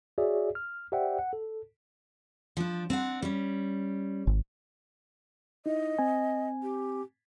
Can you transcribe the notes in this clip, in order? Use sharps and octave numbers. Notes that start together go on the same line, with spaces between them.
F#4 G#4 C#5 D5 E5
F6
G4 C5 D5 E5 F#5 G5
F#5
A4
F3 D4
C4 D4 F#5
G3 C#4
G#1
D#4 E4 D#5
C4 G#5
G4